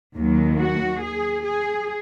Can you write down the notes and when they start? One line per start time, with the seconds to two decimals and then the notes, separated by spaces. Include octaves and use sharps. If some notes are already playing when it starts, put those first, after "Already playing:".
0.17 D#2 D#3 F#3
0.60 F#4
1.03 G#4
1.46 G#4